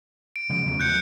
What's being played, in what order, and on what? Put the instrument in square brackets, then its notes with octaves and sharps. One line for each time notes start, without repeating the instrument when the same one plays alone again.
[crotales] D7
[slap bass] C#3 F3 G#3
E2 F#3 A3
[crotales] F#6 G6 C#7